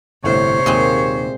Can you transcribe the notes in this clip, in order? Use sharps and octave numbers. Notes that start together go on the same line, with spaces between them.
G1 A2 C3 C5 C#5
D#2 A#2 G#3 C4